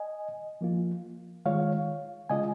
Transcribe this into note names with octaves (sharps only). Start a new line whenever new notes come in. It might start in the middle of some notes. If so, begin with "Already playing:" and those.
Already playing: D#5 G#5
F3 A#3 F4
D#3 G#3 F4 C#5 F5
C#3 G#3 F4 D#5 G#5